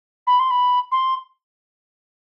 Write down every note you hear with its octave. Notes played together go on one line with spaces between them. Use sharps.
B5
C6
B5
C6